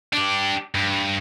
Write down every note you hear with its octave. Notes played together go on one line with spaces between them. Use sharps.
D4 G4
G2